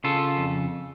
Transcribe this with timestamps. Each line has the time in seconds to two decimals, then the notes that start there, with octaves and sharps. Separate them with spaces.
0.04 C#3 F4 A4
0.38 F2